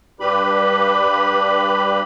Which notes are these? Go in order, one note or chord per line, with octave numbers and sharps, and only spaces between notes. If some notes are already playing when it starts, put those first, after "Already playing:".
G2 G3 G4 B4 B5